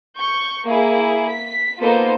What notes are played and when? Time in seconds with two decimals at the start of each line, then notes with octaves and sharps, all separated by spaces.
0.17 C#6 G6 C#7
0.65 A#3 E4 G#4
1.29 B6
1.80 A#3 B3 D#4 F4 A4 C5